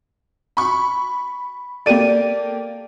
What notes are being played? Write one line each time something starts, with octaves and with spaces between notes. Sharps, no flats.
B5 C#6
A#3 G4 A4 D5 D#7